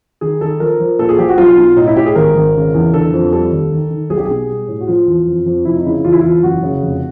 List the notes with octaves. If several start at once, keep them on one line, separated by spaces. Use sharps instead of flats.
D#3 G#4
D#3 A4
F3 A#4
F3
A#2 A4
G#4
F3 G4
F#4
B1 F4
B2
A2 D#4
E4
A2 G4
G#4
G#1 A#4
G#1
C#3
E2
D3 A4
F2
G3 A4
D#2
D#3
D#3
B1 G#4
G4
B2 G#4
G3
A2
F#4
F3 F4
E2
F2
F2
F1 E4
D#4
C#3 E4
E2 F4
E4
E2 F4
F#1 F#4
C#3
F1